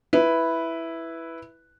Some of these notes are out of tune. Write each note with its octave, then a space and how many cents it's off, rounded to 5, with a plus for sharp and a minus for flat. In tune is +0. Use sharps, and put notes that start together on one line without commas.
E4 +0 B4 +0